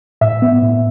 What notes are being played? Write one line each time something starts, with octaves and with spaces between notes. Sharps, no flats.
A2 E5
B3
A2